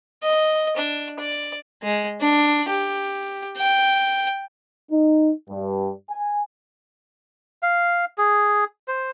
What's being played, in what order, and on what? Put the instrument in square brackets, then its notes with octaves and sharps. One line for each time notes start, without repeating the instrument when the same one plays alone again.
[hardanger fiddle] D#5
D4
D5
[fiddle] G#3
D4
G4
G5
[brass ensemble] D#4
G2
G#5
[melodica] F5
G#4
C5